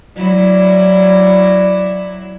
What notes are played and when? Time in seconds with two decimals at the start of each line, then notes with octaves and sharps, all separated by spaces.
0.18 F#3 E4 D5